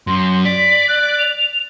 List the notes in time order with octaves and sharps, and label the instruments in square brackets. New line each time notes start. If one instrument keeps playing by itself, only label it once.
[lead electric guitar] F#2 [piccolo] C6
[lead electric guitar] D5 [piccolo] B6
[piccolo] F#6
F7